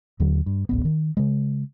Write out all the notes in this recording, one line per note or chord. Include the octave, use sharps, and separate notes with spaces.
D#2 D3 F#3
G2
D1 A1 B3
D#3
C#3 G#3